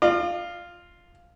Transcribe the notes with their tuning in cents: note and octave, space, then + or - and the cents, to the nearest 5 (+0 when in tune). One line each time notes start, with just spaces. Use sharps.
F4 +0 D5 +45